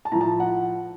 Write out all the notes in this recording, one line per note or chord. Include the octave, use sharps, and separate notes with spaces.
A5
A2 F3 A#5
A5
F#5